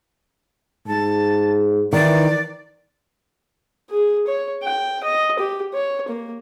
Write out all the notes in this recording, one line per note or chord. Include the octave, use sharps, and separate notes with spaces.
G#2 A5
D#3 E3 D5
G#4
C#5
G5
D#5
G4
C#5
A#3